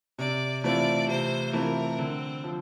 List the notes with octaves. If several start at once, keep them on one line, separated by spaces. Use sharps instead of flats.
C3 D5
E3 A3 C4 F4 D5
C3 C5
E3 A3 C4 F4 A#4
D3 C4
F3